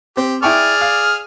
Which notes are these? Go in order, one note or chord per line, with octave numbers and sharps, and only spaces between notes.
C4 G4
E4 G#4 D5 G5 C#6 F6
F5